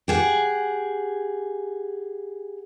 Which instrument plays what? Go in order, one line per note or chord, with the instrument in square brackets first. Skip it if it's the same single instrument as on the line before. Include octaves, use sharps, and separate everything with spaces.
[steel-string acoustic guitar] G4 G#4 F#5